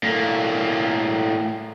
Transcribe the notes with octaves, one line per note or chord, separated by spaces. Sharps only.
A2 A#3